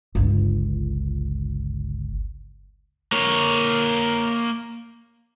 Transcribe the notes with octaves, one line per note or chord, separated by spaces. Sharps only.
G1 C#2
A#3 C#5